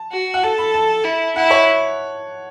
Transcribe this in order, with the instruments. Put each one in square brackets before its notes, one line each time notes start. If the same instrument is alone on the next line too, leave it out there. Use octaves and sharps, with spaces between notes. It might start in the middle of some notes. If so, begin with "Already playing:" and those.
Already playing: [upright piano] A5
[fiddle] F#4
[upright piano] F#5
[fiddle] A4 [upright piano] A5
[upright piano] B5
A5
[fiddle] E4
[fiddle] E4 [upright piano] F#5
[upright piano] C#5